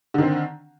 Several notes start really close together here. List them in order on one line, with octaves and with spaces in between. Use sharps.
D3 D#3 C4